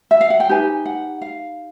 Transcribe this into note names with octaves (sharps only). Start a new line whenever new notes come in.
E5
F5
F#5
G5
D#4 G4 B4 G#5
F#5
F5